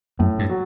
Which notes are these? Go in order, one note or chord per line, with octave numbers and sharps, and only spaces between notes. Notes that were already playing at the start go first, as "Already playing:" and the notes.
F#2 A2
G2
F#3